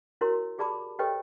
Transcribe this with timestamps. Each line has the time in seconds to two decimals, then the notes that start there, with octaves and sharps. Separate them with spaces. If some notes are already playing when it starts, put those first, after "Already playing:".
0.21 E4 F#4 A#4 C#5 C6
0.58 G4 G#4 D5 A5 B5 D6
0.99 G4 A4 B4 C#5 D#5 G5